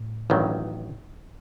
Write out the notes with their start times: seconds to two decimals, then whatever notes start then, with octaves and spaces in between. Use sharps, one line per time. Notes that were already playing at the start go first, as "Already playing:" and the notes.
Already playing: A2
0.30 A1 G2 D#3 F#3